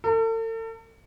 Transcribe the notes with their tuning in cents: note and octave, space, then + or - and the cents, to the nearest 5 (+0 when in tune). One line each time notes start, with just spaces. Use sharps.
A4 +40